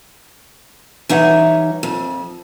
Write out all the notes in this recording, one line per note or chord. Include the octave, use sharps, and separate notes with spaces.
E3 G3 D#4 C#5 E5 F#5
F2